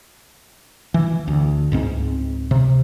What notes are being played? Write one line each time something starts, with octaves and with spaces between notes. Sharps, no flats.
E3
D2
C#2 G#2 C4
C3